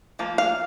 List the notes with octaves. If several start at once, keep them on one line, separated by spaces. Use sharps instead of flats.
F3 A#3
F5